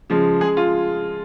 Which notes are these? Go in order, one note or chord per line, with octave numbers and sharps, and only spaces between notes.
C#3 F3 G#3
C#3 G#3 G#4
F4